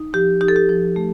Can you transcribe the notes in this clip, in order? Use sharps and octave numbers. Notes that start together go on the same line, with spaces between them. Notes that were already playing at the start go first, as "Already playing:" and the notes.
Already playing: D#4
F3 G4
D#4 G4
A4
G4
F3
A3